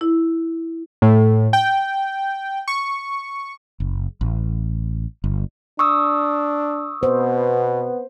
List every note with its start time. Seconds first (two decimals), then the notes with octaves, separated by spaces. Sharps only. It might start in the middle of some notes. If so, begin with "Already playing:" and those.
0.01 E4
1.02 A2
1.53 G5
2.68 C#6
3.80 F#1
4.21 A1
5.24 G1
5.79 D4 C#6 D#6 E6
7.03 B2 B3 C5